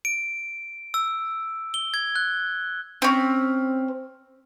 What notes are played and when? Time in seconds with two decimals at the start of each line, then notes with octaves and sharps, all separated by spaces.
0.05 D7
0.94 E6
1.74 G7
1.94 G#6
2.16 F#6
3.02 C4 C#4